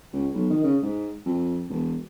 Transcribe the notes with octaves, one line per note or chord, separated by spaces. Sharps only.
C#2
B1
D#3
C#3
G#2
F2
E1